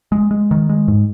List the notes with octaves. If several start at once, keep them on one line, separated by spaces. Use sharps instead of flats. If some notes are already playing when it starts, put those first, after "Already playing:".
G#3
G#3
D#3
G#3
G#2